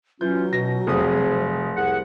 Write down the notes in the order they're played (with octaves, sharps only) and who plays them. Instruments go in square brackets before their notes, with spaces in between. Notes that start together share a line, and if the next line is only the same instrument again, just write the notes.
[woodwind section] E3 C#4 F4 [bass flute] F#3 [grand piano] G6
[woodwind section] B2 [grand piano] A#6
[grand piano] F1 D#6 [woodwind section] C4 G#4
[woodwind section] C2 G#4 F#5